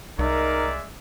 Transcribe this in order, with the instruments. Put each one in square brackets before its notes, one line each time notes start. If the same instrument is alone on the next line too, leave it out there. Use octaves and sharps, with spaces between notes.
[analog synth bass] C2 [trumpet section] G#3 D5 E5 [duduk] D#4 [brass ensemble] A#4